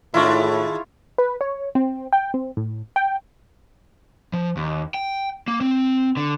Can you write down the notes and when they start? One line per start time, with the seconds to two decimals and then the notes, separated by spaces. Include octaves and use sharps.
0.14 A2 D#3 G#3 D4 E4 F4 C#5
1.18 B4
1.41 C#5
1.75 C4
2.13 G5
2.34 C4
2.57 A2
2.96 G5
4.33 F3
4.57 D#2
4.94 G5
5.48 A#3
5.61 C4
6.17 D3